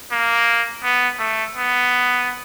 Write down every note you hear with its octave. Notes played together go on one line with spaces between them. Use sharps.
A#3
B3
A3
B3